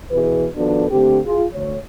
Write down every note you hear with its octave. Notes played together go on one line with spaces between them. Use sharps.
B2 E3 G#4 B4
D#3 F3 B3 D4 F#4 A4
D3 A3 C4 G4
F4 G#4
D2 C#5